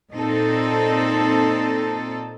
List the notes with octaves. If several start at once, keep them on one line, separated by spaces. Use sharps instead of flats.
A#2 C4 D#4 A4